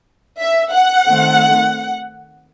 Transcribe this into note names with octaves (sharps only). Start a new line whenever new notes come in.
E5
F#5
D#3 A3 C4